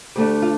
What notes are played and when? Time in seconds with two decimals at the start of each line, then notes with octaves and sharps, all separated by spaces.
0.15 D2 D3 A3 D4 G4
0.42 F4